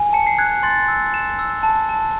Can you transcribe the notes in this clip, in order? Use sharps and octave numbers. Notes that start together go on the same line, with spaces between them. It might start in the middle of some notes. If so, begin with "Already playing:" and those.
Already playing: G#5
A5 C#7
C7
F#6 G#6
G#6
C6 A6
E6
C6 E7
E6
A5
A5